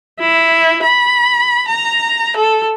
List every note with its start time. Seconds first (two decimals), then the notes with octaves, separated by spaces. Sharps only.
0.19 E4
0.83 B5
1.68 A#5
2.36 A4